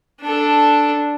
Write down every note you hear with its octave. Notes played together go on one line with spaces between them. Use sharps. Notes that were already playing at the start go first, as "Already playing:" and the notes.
D4 A4